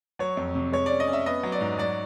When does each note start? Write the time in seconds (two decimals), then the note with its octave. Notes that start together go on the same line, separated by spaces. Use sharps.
0.19 F#3 C#5
0.37 F2
0.55 C3
0.72 G#3 C#5
0.86 C#4 D5
1.00 D#5
1.08 C#4
1.13 E5
1.26 B3 D#5
1.43 F#3
1.52 D5
1.61 G#2
1.78 F#3 D5